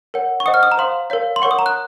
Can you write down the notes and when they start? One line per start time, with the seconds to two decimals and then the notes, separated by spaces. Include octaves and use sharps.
0.14 A#4 C#5 F#5
0.40 C#6
0.46 C5 D#5 F#5 D#6
0.54 F6
0.63 D#6
0.72 A#5
0.78 C5 F5 C6
1.10 A#4 C#5 F5
1.36 C6
1.42 A#4 C#5 F#5 C#6
1.51 D#6
1.59 A#5
1.66 F#6